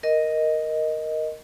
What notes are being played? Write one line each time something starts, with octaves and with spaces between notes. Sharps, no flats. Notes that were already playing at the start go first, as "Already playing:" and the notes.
A#4 D#5